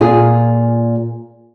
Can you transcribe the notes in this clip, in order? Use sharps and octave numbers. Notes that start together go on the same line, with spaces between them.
A#2 F4 G#4